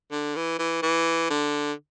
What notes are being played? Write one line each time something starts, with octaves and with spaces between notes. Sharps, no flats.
D3
E3
E3
E3
D3